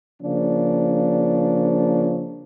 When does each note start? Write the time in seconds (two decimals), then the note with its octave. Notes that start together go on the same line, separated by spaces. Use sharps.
0.23 C#3 F3 A#3 D4